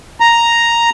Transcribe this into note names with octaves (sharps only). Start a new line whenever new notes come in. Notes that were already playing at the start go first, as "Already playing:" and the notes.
A#5